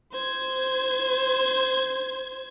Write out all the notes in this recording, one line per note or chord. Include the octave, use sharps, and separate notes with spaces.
C5 G#6